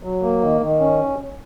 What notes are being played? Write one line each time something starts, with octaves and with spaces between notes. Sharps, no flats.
F#3
A#3
D#3
D#3
C#4